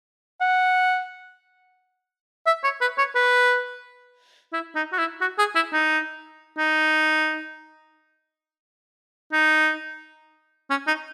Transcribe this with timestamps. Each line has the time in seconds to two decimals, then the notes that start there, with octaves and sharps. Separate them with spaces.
0.41 F#5
2.46 E5
2.64 C#5
2.81 B4
2.98 C#5
3.15 B4
4.53 E4
4.75 D#4
4.92 F#4
4.98 E4
5.21 F#4
5.38 G#4
5.55 E4
5.73 D#4
6.58 D#4
9.33 D#4
10.70 C#4
10.87 D#4